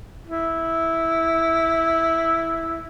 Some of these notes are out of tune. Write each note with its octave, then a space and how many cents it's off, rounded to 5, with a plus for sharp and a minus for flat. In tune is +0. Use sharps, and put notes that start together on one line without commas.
E4 -5